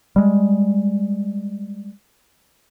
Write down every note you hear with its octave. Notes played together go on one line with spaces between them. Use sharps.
G3 G#3